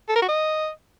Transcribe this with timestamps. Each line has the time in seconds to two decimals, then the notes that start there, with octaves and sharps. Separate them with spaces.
0.09 A4
0.15 A#4
0.22 F#4
0.29 D#5